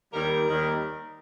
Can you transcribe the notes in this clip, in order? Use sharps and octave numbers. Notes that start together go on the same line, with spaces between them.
D#2 D#3 G3 A#4
D#2 D#3 G3